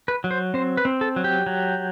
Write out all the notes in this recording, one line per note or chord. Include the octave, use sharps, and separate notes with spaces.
B4
F#3
C5
C4 C5
B4
C4
A4
F#3
G4
F#3